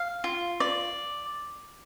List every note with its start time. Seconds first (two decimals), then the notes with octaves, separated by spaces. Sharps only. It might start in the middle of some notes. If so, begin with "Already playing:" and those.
Already playing: F5
0.24 F4
0.60 D5